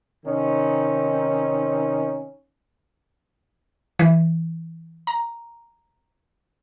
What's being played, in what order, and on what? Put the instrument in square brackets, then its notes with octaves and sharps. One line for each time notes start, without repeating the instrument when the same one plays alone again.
[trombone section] C3 D#3 C4 C#4 D#4
[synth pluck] E3
A#5